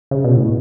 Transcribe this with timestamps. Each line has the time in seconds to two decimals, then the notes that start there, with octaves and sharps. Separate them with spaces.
0.11 C#3
0.24 B2
0.37 A2